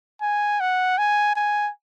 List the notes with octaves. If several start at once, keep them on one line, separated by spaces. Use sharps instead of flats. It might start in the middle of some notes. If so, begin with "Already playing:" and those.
G#5
F#5
G#5
G#5